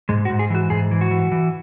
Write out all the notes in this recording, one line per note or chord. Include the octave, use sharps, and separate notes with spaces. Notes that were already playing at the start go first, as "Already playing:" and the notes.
G#2 G#3
F#4
G#2
G#4
E3 F#4
G#2 G#4
E3
F#4
E3
E3